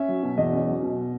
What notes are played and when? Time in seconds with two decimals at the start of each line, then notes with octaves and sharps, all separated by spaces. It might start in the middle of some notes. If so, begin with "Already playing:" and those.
Already playing: C#4 E5
0.08 F#3
0.23 B2
0.37 E2 D#5
0.53 C#4
0.67 F#3
0.82 B2